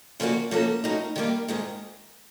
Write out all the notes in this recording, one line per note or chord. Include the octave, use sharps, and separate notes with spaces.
C#3 F3 A#3 D4 F#4
F3 A#3 C#4 F#4 A4
A2 F#3 A#3 D#4
D#3 G3 A#3
G#2 D#3 G#3